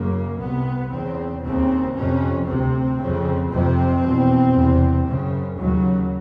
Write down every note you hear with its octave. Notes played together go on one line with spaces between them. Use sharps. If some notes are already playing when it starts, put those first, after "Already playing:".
Already playing: F#2 C#3 A#3
C2 C3 B3
E2 C#3 C4
D#2 C#3 C4
F2 C3 C#4
D2 C3 C4
F2 C#3
F2 C3 C4
E2 B2
E2 C3
F#2 C#3
D#2 C#3 F#3